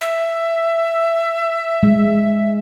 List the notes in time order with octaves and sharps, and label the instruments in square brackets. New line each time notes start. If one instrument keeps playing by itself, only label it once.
[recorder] E5
[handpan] G#3